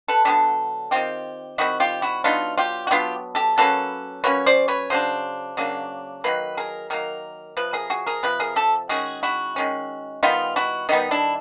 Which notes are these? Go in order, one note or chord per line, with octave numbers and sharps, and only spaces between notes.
A4 B4
D3 F#3 B3 D4 G4 A4
D#3 G3 C4 F4 G4
D#3 G3 C4 E4 F#4
F4 G4
E4 F#4
F#3 B3 D4 D#4 F4
F4 G4
F#4
F#3 B3 D4 F4 G4
G4 A4
F#3 A#3 C#4 A4 B4
F#3 A#3 C#4 B4 C#5
C5 D5
B4 C#5
C#3 F#3 D4 C5
C#3 F#3 A#3 D4
D#3 F#3 A#3 B4
G#4 A#4
D#3 F#3 A#3 A#4
C3 F3 B4
G#4 A#4
F#4 G#4
G#4 A#4
C3 F3 B4
G#4 A#4
G4 A4
D#3 G#3 C#4 F#4 G#4
E4 F#4
D#3 G#3 C#4
D#3 G3 B3 D#4 F4
E4 F#4
D#3 G3 B3 D#4
D4 E4